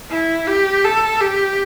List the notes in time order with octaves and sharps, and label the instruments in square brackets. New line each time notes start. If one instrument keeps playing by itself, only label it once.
[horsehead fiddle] E4
G4
A4
G4